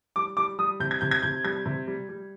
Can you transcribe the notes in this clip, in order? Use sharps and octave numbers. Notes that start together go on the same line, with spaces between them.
G3 D6
G3 D6
G3 D#6
C3 G6
G#6
C3 G6
G#6
C3 G6
G3 G#6
C3
G3
G3